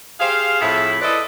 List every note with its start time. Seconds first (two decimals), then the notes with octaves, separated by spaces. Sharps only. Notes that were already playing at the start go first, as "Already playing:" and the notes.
0.20 G4 G#4 C5 F5
0.61 F2 A2 E4 G#4 A4 E5
1.01 E4 A4 B4 C5 D5 D#5